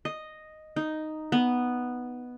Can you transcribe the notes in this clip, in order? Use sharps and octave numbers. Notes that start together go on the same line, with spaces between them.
D#5
D#4
B3